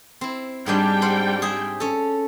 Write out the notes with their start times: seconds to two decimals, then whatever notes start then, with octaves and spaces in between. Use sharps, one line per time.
0.21 C4 E4
0.66 G#2 G3 G#3 D4 G5
1.02 C5 F#5
1.42 G#4 E5
1.80 C#4 A4